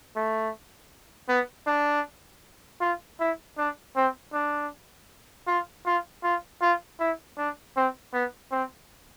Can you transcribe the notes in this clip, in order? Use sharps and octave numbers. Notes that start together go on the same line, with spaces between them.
A3
B3
D4
F4
E4
D4
C4
D4
F4
F4
F4
F4
E4
D4
C4
B3
C4